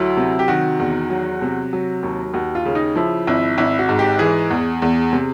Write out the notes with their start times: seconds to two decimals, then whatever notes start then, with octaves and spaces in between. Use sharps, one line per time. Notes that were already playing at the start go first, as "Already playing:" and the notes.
Already playing: D2 F#3 E4
0.17 C3
0.39 G4
0.48 D#3 F#4
0.80 E2
1.10 F#3
1.42 C3
1.73 F#3
2.03 D#2
2.34 D#2 F#4
2.55 F4
2.65 C#3
2.75 D#4
2.96 F3 E4
3.27 G#1 E4
3.58 G#1 E4
3.79 F#4
3.89 G#2
3.99 G4
4.19 E3 G#4
4.50 E2
4.82 E2
5.13 C3